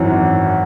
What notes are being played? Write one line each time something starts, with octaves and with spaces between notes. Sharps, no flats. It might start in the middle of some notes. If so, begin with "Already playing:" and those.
Already playing: G#1 F#2 E3